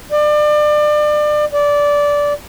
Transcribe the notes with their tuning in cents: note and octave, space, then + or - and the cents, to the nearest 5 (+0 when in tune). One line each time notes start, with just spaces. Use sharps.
D5 +30
D5 -15